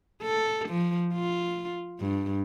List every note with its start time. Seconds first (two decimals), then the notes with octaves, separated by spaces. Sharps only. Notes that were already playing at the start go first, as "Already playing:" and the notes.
0.22 A4
0.69 F3
1.14 F4
2.00 G2